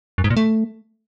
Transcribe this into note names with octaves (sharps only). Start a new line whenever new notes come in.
F#2
G#2
A#2
A3